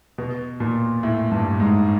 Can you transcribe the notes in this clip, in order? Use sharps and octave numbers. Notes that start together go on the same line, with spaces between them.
B2
A#2
A2
G2
G#2